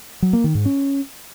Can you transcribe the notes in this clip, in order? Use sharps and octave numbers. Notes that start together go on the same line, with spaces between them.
F#3
A#3
D#3
G#2
C#4